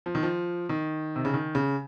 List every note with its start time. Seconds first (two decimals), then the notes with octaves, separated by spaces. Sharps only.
0.06 F3
0.15 D#3
0.23 F3
0.69 D#3
1.16 C3
1.25 C#3
1.34 D#3
1.55 C#3